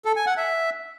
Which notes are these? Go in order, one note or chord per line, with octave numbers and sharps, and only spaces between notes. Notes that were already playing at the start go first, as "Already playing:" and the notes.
A4
G#5
F#5
E5